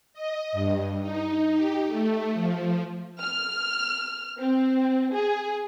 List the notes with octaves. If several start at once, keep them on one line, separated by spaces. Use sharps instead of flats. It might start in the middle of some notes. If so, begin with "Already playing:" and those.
D#5
G2
D#4
G4
A3
F3
F6
C4
G#4